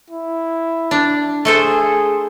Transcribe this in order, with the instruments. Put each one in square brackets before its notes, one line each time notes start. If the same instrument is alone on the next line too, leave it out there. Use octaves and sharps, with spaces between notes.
[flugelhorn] E4
[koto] D4
[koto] A3 A4 C5 [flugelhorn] G#4